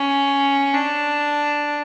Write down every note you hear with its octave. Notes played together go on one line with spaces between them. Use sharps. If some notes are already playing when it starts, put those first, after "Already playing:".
Already playing: C#4
D4